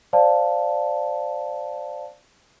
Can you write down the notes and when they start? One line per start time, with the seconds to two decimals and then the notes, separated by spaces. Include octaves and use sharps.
0.13 C5 D5 F5 A5